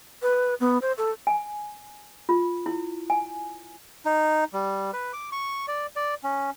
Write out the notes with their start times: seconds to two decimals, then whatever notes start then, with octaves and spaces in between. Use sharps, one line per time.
0.22 B4
0.60 B3
0.82 C5
0.98 A4
1.27 G#5
2.29 F4
2.66 E4
3.10 G#5
4.05 D#4
4.54 G3
4.93 B4
5.13 D6
5.32 C#6
5.68 D5
5.96 D5
6.24 C#4